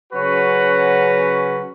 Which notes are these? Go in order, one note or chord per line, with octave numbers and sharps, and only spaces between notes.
C#3 F#3 C#4 F#4 B4